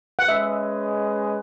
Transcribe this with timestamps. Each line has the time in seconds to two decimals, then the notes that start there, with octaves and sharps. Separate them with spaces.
0.19 F#5
0.28 G#3 C#4 G#4 B4 D#5 E5